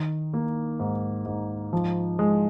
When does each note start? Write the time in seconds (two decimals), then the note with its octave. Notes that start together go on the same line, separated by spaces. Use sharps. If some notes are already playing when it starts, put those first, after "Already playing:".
Already playing: D#3
0.34 A#3
0.80 G#2
1.26 G#2
1.73 F3
2.19 G#3